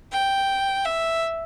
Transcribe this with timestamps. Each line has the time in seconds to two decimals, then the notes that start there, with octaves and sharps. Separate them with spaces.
0.12 G5
0.85 E5